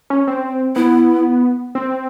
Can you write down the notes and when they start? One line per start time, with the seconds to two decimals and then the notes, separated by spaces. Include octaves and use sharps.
0.10 C#4
0.27 C4
0.76 B3 E4
1.75 C4